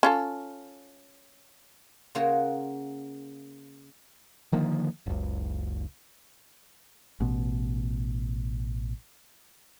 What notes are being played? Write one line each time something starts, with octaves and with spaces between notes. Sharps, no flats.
C#4 F4 A4
C#3 A#3 F4 F#4 A#4 C#5
D3 D#3 F3 A#3
F#1 C#2
A1 B2